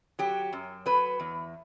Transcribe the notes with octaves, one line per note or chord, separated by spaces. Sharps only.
F#3 G4
F#2
F#3 B4
E2